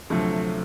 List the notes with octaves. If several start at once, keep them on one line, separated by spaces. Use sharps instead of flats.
D2 C3 F3 F#3 A3